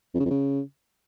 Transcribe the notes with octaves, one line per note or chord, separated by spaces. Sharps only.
F2
C#3
F2
C#3